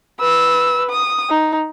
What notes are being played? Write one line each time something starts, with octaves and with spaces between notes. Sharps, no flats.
B4 E6
D#6
D#4